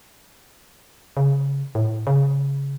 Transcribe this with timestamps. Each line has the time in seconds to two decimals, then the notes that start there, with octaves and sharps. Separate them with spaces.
1.17 C#3
1.75 A2
2.07 C#3